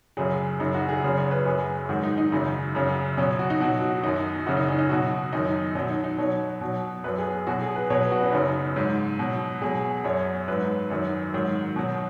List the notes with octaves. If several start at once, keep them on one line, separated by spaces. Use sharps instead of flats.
F#2 C#3 F#3 G#4
F#2 C#3 F#3 D#4
F#4
G#4
F#2 C#3 F#3
C#5
B4
F#2 F#3 G#4
G#2 D#3 F#3 F#4
D#4
D#4
F#2 C#3 F#3
F#2 C#3 F#3
B2 F#3 C#4
F#4
D#4
B2 F#3 F#4
F#4
F#2 D#3 F#3 D#4
F#2 C#3 F#3 F#4
D#4
C#4
D#4
B2 F#3 F#4
F#2 D#3 F#3 D#4
B2 F#3 C#4
D#4
D#4
B2 F#3 C#5
B2 F#3
F#2 F#3 B4
G#4
B2 F#3 F#4
G#4
B4
B2 F#3 C#5
B4
F#4
C#4
F#2 C#3 F#3 D#4
G#2 F#3
B2 F#3
B2 F#3 G#4
F#2 F#3 C#5
G#2 F#3 B4
F#2 D#3 F#3
G#2 D#3 F#3
B2 F#3